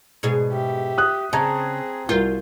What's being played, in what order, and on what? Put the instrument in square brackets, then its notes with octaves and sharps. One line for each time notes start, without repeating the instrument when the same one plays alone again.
[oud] G#2 B2 G#4
[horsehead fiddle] G4 E5
[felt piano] D#6 F#6
[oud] C#3 [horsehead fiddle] C4 G#4 [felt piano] A5 A#5 G#6
[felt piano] C2 A#4 G6 [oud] F4 [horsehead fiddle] F#4